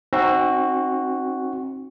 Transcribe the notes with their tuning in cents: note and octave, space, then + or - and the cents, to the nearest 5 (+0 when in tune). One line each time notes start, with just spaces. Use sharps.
C4 +30 D#4 +0 F#4 +0